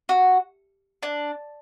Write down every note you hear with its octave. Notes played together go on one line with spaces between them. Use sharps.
F#4
D4